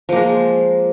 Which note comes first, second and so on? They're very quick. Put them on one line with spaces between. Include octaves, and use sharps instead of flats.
F3 A#3 G#3